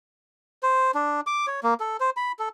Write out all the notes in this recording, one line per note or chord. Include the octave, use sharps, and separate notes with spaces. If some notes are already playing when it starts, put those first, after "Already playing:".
C5
D4
D6
C#5
A#3
A4
C5
B5
A4